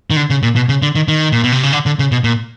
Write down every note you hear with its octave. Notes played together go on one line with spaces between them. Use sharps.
D#3
D3
C#3
A#2
B2
C#3
D3
D#3
D#3
A#2
B2
C3
C#3
D3
D3
C#3
B2
A#2